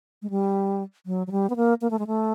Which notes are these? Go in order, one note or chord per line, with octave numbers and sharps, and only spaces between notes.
G#3
G3
F#3
F#3
G3
B3
A#3
A#3
A3
G#3
A3